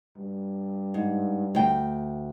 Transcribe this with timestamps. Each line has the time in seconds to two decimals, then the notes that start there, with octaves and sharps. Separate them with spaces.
0.17 G2
0.94 G#2
1.55 D2 G5